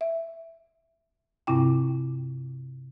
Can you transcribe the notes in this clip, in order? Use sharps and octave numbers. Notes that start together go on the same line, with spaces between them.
E5
G2 C3 C4 E4 G5